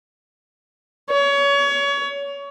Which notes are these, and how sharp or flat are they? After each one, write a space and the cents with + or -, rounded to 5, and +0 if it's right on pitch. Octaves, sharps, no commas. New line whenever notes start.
C#5 +25